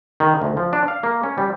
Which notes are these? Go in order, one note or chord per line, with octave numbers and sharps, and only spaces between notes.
D#3
D2
F3
D4
F5
A#3
C#4
G3